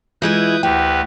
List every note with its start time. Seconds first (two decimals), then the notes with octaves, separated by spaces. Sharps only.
0.22 E3 G#3 E4 F4 B4 D#6 G6
0.63 D2 F#4 G4 B4 G5